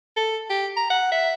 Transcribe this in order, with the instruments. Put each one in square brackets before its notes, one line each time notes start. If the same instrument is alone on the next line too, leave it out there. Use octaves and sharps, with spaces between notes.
[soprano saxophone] A4
G4
A#5
F#5
E5